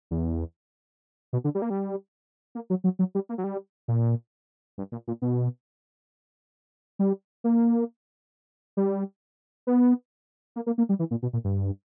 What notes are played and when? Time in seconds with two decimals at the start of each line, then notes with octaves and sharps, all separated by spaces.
0.11 E2
1.33 B2
1.44 D3
1.55 G3
1.62 A#3
1.70 G3
2.55 A#3
2.70 F#3
2.84 F#3
2.99 F#3
3.15 G3
3.29 A#3
3.38 F#3
3.44 G3
3.88 A#2
4.78 G2
4.92 A#2
5.08 A#2
5.22 B2
6.99 G3
7.44 A#3
8.77 G3
9.67 B3
10.56 A#3
10.67 A#3
10.78 A#3
10.89 G3
10.99 E3
11.11 A#2
11.22 B2
11.33 A#2
11.44 G2